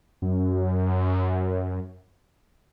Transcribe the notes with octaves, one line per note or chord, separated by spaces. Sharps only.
F#2